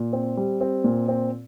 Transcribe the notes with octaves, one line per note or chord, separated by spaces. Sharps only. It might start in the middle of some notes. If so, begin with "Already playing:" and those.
Already playing: A#2
C4
G3
C4
A#2
C4